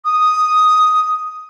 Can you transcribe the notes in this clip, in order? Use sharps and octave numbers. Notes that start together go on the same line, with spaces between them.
D#6